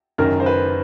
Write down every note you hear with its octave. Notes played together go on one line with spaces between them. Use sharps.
F#1 F#2 D#3 A#4
C5
B4